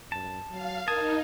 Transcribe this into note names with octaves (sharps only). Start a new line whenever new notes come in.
F#2 A5
F#3 F5
D#4 A#4 A5 D#6 G#6